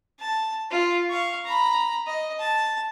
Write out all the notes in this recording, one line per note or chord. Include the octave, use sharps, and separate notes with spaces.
A5
F4
F5 C#6
A#5 B5
D#5
A5